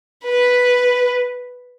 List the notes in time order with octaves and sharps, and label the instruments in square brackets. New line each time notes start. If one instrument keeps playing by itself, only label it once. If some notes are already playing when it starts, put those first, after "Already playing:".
[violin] B4